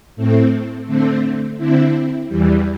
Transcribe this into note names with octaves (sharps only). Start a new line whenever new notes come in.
A2 A3 C4
D3 A3 C4
D3 C4 E4
E2 E3 G3